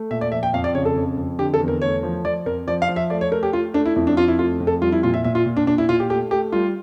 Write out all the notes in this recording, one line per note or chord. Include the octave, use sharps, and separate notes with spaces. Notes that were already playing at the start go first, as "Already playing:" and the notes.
Already playing: A3
A#2 E5
D5
F3 E5
G5
F2 F5
D5
C#3 C#5
A4
F2
F2
D3 G4
A4
E2
A#4
A3 C#5
F3
F3 D5
F2 A#4
F3 D5
F5
F3
E5
A3 D5
C#5
A3 A#4
G4
A3 F4
A3 D4
E4
F2 E4
D4
F2 F4
E4
A3 F4
F2
A4
G3 F4
E4
A#2 F4
E5
A#2 E5
F4
A#2
D4
A#2 D4
E4
A#2 F4
G4
A3 G4
A3 G4
G3 F4